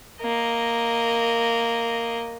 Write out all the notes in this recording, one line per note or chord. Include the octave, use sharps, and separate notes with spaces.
A#3 D#5